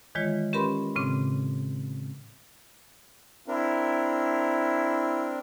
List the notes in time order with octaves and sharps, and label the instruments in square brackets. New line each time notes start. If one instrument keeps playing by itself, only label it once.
[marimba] D#3 E3 G#3 F4 C#5
C#4 G4 A#4 B4 B5 C6
A2 C#3 C4 D6
[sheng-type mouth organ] C4 D4 A#4 [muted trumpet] E4